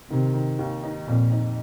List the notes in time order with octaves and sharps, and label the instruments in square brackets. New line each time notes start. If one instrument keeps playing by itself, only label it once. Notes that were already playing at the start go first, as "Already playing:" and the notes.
[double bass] C3 [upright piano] D#3
[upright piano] D#3
D#2
D#4
[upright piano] F2 [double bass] A#2
[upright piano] D#4